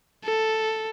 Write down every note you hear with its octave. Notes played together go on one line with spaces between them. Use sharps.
A4